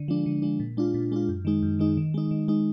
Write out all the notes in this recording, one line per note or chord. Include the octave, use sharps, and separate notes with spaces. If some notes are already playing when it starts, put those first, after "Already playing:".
Already playing: D3
F3 G#3 D4
D3
F3 G#3 D4
A#2
G#3 D4 F4
A#2
G#3 D4 F4
F#2
D#3 G#3 D#4
F#2
D#3 G#3 D#4
D#3
G#3 D#4
D#3
G#3 D#4